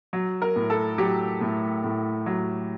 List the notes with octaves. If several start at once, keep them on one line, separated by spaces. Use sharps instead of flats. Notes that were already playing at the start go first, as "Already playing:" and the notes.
F#3
A#4
A2
A4
F#3 G4
A2
A2
F#3